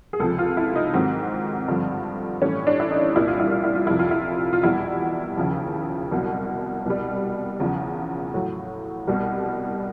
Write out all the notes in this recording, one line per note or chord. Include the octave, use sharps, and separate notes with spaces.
G#4
C#2 C3 F3 A4
F4
E4
D#4
G#2 D#3 F#3 C4
G2 D3 F3
A2 E3 G3 C#4
D4
E4
D#4
C2 A#2 G3 E4
F4
E4
F4
E4
F4
F2 C3 F3 E4
F4
E4
F4
E2 B2 G3 E4
D#2 C#3 F3
C2 B2 F#3
C2 B2 G3
E2 C#3 F3
A2 F#3
C2 B2 G3